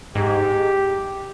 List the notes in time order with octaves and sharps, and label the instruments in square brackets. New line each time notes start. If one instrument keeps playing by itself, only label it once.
[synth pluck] G#2 [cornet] G4